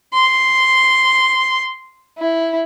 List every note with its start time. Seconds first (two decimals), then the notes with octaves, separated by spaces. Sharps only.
0.14 C6
2.18 E4